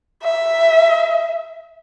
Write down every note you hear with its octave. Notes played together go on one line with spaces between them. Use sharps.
E5